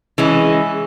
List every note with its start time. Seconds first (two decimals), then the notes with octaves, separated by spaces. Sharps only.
0.18 E3 G#3 C#4